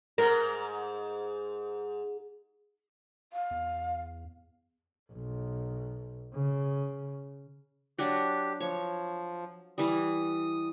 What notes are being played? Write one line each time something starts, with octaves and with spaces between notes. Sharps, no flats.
G#2 A#4
F5
E2
B1
C#3
F#3 D4 F#4 G4
F3 C#5
E3 G3 D#6